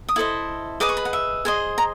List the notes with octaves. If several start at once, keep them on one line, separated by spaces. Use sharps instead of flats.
D#6
E4 A4 C5 D#5
G#4 B4 D#5 D6
C#6
B5
F#5
E5
G#4 C5 D#5
A#5